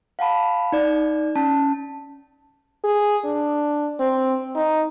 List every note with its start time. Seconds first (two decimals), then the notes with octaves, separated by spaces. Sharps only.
0.19 F5 F#5 A5 B5
0.72 D#4 D5
1.36 C#4 A5
2.84 G#4
3.24 D4
4.00 C4
4.55 D#4